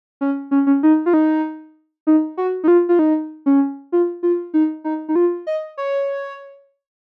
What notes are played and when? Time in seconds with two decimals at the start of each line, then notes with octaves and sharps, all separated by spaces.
0.21 C#4
0.51 C#4
0.67 C#4
0.83 D#4
1.06 F4
1.14 D#4
2.07 D#4
2.37 F#4
2.64 D#4
2.68 F4
2.89 F4
2.99 D#4
3.46 C#4
3.92 F4
4.23 F4
4.54 D#4
4.84 D#4
5.09 D#4
5.16 F4
5.47 D#5
5.78 C#5